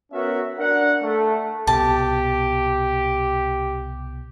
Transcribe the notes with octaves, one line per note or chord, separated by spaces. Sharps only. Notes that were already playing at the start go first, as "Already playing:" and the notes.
B3 C#4 F#4 A#4 E5
D4 A#4 F#5
A3
C2 B2 G4 A5